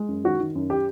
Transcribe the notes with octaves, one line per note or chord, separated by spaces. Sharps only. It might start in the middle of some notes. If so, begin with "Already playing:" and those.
Already playing: G#3
F#2
D#3 F#4
D#3
F#2
G4